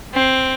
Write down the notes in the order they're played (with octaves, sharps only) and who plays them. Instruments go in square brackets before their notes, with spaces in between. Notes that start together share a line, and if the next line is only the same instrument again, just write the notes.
[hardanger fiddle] C4